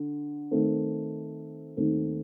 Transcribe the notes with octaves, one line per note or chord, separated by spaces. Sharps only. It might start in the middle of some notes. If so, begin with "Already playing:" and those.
Already playing: D3
D#3 A3 C4
D#2 D#3 A3 C4